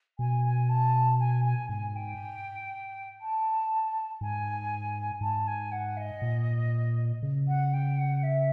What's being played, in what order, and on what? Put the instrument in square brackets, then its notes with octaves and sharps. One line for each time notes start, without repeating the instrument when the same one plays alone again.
[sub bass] B2 [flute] G#5
[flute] G#5
A5
G#5
G#5
[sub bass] G#2 [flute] G#5
[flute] G5
A5
[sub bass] G#2 [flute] G#5
[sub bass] G#2 [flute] A5
[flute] G#5
F#5
D#5
[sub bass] A#2
C#3
[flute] F#5
G5
F#5
E5